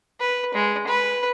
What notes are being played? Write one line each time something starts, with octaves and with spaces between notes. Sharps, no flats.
B4
G#3
B4